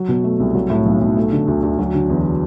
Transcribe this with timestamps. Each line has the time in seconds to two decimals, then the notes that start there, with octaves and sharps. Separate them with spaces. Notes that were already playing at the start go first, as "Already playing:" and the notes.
Already playing: F#3
0.08 B2
0.24 A3
0.40 C2
0.55 F#3
0.70 A2
0.86 B1
1.01 B1
1.17 A3
1.32 D3
1.48 D2
1.63 D2
1.79 F#3
1.94 D3
2.09 E2